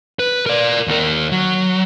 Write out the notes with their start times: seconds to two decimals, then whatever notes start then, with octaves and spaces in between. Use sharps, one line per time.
0.19 B4
0.46 A#4 D5
0.88 D#2 A#4
1.32 F#3